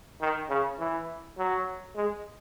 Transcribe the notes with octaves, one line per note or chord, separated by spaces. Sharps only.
D#3
C#3
E3
F#3
G#3